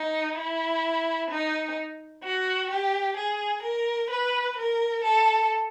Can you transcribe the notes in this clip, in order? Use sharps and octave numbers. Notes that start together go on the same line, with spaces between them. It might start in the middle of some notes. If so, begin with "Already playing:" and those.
Already playing: D#4
E4
D#4
F#4
G4
G#4
A#4
B4
A#4
A4